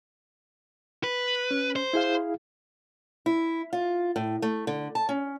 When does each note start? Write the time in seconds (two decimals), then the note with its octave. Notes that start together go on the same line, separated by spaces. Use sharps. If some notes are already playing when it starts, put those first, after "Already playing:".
1.04 B4
1.51 C#4
1.76 C5
1.93 E4 G#4 F5
3.26 E4
3.73 F4
4.16 A2
4.42 A3
4.67 D3
4.95 A5
5.09 C#4